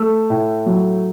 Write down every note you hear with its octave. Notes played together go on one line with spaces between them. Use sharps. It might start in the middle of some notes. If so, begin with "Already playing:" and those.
Already playing: A3 E6
A2
F#3